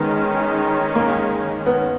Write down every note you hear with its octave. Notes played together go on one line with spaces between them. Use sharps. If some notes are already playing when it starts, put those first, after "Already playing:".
Already playing: D#3 G#3 B3 C#4
A#3
B3